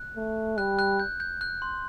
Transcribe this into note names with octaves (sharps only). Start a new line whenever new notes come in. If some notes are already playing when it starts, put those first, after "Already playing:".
Already playing: F#6
A3
G3 F#6
F#6
G6
G6
F#6
C6